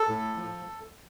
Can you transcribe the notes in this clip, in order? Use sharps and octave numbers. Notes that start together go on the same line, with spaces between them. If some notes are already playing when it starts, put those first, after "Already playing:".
Already playing: A4
A2
F3